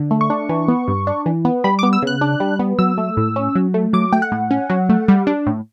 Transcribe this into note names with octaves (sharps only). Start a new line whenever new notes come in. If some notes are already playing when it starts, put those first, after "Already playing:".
Already playing: D3
A3
C#6
D4
E3
B3
G2
D4
E3
B3
G3 B5
B3 D6
E6
C#3 F#6
D4
G3
B3
F#3 E6
A3
A2
C#4
F#3
A3
F#3 D6
A3 G5
F#5
A2
C#4
F#3
A3
G3
D4
A2